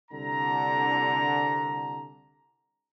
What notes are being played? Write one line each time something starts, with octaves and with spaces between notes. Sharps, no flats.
C2 D3 A#5